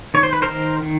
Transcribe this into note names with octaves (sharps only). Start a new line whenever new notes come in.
D#3 C#5
C5
B4
A#4 C5
D#3
D#3